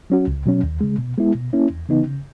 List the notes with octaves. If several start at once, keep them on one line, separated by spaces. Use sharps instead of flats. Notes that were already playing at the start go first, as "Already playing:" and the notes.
F#3 C#4 F#4
C#2
B2 F#3 C#4
D#2
C#3 G#3
B2
G#3 B3 E4
B2
A#3 C#4 E4
E2
C#3 E3 B3 D#4
C#3